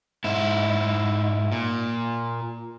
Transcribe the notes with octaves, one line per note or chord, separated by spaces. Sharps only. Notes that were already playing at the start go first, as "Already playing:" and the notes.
G#2 E4
A#2